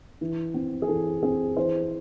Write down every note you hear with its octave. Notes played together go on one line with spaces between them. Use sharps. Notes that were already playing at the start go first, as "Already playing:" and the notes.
E3
C4
G#4
E3 A4
C4 G#4
E3 C5